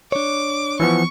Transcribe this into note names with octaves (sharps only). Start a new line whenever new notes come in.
D4 C#5 D6
E3 F3 B3 C#6